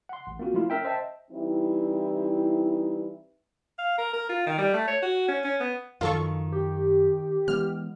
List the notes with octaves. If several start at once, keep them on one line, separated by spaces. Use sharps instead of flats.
F#5 C6
A1
A#3 C4 F4 F#4
F3 A3 E4 F4
C#4 A#4 E5 G5
C5 D#5 E5 G5 A5
E3 G3 C4 D#4 E4
F5
A#4
A#4
F4
D#3
G3
A3
C#5
F#4
C#4
C#4
B3
F#2 D#3 F3 F4 A4 C#6
G4
E3 G#3 B3 F6